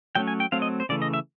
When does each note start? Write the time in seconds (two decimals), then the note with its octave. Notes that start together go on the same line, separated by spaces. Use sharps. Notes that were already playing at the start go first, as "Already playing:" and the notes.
0.15 F#3 A3 C#4 G5
0.28 G#5
0.40 G5
0.52 F#3 A3 C4 F5
0.62 D#5
0.80 C5
0.89 C#3 E3 A3 D5
1.02 D#5
1.14 E5